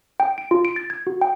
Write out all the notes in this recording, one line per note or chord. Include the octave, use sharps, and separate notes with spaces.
G5
D7
F4
D7
A6
G#6
F#4
G5